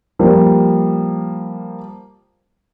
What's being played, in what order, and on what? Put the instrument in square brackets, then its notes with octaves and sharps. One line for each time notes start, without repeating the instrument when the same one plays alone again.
[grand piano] F3 G3 A#3